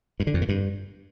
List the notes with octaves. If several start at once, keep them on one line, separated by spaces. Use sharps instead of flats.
G2
D3
F2
A#2
G2